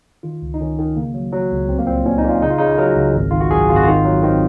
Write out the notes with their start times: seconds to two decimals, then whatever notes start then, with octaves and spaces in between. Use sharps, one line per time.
0.23 D#3 F4
0.42 C#2
0.54 D#4
0.61 D#3 C#4
0.79 D#3
0.96 C#3 A#3
1.14 F#3
1.33 F#3
1.51 C#2
1.69 C2 C4
1.78 A#3
1.87 A#2 C4
2.05 A#2 C#4
2.18 D#4
2.24 A#2
2.29 F4
2.42 C#3 D#4
2.50 F4
2.58 C#3 D#4
2.78 F#3 A#4
2.97 C#2
3.14 G#1
3.31 D#3 F4
3.41 F#4
3.51 F#2 G#4
3.69 G#1 F4
3.76 F#4
3.84 D#3 F4
4.05 F#3
4.23 D#3 C4